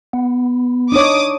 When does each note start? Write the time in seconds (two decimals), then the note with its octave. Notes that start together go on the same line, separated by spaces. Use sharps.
0.13 B3
0.92 D4 D#4 C#5 D6 D#6